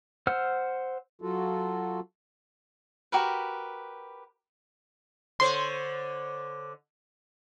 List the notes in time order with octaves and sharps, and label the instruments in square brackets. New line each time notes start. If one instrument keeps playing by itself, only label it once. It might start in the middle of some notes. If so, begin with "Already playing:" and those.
[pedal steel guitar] C5 F#5 E6 F6
[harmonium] F#3 F4 F#4 A4
[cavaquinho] F#4 G4 A#4 B4
[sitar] D3 C5 C#5 [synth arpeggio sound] C6